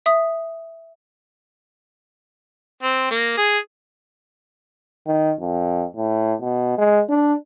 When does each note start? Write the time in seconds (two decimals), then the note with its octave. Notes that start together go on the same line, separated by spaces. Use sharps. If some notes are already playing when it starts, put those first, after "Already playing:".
0.06 E5 D#6
2.83 C4
3.11 A#3
3.37 G#4
5.07 D#3
5.40 F2
5.96 A2
6.41 B2
6.78 G#3
7.09 D4